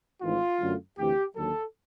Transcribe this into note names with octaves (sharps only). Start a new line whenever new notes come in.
G#1 G#2 E3 A3 F4
F#2 D3 F#3 A3
D2 C3 E3 G4
D#2 D3 F#3 A4